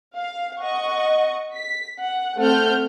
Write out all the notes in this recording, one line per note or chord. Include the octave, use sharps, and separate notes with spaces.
F5
D#5 F#5 C#6
B6
F#5
A3 C4 F#5 F6 G6